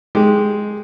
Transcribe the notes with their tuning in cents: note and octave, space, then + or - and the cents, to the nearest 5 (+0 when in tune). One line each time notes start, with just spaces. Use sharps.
G#3 +5 G4 +0